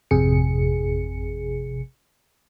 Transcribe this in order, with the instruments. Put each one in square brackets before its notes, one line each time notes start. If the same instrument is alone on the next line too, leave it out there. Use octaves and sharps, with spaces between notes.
[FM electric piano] G#1 F2 C3 G#4 C#7